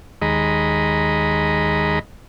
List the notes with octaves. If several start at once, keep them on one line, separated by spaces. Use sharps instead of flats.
D#2 G#3 D#5 A#5 B5